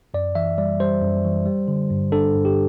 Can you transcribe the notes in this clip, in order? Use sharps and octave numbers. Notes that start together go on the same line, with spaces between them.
F#2 D5
E3 E5
G3 D5
G3 C5
F#2
E3
G3
D3
G2
D4 A4
G2
G4